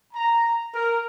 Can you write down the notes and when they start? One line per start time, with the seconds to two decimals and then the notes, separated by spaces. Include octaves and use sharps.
0.14 A#5
0.74 A#4